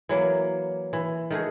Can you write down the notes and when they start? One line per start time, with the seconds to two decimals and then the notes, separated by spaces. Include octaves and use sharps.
0.09 E3 F#3 A#3
0.93 E3
1.31 D#3 A3 F#4 G#4